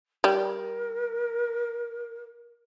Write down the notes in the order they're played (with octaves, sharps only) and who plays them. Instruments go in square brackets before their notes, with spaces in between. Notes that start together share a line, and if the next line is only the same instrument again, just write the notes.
[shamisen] G3 [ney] A#4